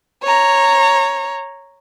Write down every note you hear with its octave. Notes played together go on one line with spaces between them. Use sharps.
C#5 A#5